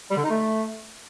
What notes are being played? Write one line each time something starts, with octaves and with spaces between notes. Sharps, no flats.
G3
D3
D#4
A3